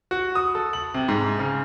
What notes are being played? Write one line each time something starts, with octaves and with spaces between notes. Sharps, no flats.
F#4
D#6
A4
F#7
C3
G#2
C#3